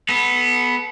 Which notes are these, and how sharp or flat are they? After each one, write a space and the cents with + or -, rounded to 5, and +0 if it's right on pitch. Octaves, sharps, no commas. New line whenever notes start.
B3 +0 A4 -30